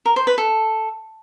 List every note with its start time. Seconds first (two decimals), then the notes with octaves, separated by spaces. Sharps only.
0.06 A#4
0.16 C5
0.27 B4
0.38 A4